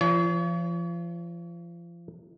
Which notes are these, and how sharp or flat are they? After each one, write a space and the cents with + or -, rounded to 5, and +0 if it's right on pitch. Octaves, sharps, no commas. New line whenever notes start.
F3 -30 C#5 +40